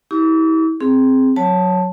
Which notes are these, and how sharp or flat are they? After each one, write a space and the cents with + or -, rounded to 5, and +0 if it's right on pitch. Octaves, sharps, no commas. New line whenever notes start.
E4 -35 G4 +0 D6 -45
C4 +0 G#4 +10
F#3 -10 C#5 +0 A5 +0